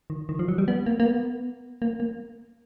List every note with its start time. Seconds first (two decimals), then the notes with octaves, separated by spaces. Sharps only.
0.10 D#3
0.29 D#3
0.39 F3
0.48 F#3
0.58 G3
0.68 B3
0.86 A#3
1.00 A#3
1.06 B3
1.82 A#3
2.00 A#3